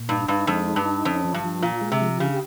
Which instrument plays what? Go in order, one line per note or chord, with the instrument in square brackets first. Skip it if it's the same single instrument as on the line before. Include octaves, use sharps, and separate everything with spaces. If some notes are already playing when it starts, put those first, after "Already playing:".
Already playing: [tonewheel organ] A#2
[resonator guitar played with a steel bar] G2 [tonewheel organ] D#4
[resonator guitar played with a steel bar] G2 [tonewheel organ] D#4
[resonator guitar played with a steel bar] F2 [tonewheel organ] G#3
[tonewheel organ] D#4
[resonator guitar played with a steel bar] G2
[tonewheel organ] D#4
[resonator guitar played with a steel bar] F2 [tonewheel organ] C#4
[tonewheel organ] F3
[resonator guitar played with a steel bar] G2
[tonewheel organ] F3
[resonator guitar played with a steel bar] A#2 [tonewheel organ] F4
[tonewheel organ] G#3
[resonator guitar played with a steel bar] C3
[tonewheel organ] F3
[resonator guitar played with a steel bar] C#3 [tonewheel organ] G4